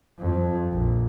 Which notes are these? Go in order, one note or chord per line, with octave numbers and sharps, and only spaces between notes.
F2
A#1